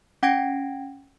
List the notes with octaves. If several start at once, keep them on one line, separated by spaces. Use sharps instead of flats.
C#4 F#5 G5 G#6 A#6 D7